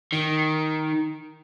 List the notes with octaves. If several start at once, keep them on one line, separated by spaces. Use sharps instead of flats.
D#3